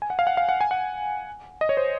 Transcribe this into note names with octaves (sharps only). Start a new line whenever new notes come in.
G#5
F#5
F5
F#5
F5
F#5
G#5
F#5
D#5
C#5
C5